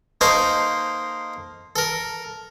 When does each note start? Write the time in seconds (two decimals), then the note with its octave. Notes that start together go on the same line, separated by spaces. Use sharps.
0.21 A#3 D#4 A4 C5 C#6
1.76 A4 A#4